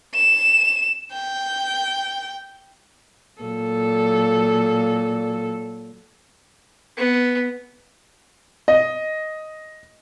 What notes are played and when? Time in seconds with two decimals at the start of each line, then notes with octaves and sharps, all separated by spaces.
0.15 E7
1.12 G5
3.42 A#2 F#3 A4
6.97 B3
8.68 D#5